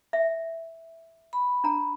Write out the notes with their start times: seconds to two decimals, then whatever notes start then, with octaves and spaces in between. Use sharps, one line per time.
0.13 E5
1.33 B5
1.64 D4 A#5